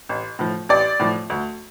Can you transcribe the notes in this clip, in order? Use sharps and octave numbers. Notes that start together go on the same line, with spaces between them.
A1
A2 F3
A1 D5
A2 F3
D2